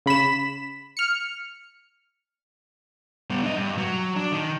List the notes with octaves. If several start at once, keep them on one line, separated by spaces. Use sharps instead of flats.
C#3 B5 B6 E7
F6 C#7
G3 B3
D4 D#5
G2
F#3
D4
D#3